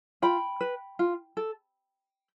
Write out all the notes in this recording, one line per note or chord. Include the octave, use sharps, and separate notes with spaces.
F4 G5 B5
B4
F4
A4